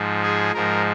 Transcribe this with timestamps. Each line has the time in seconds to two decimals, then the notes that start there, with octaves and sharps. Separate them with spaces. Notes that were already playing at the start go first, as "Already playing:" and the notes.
Already playing: G#2 F3
0.23 G#4
0.54 G#2 F3 A#4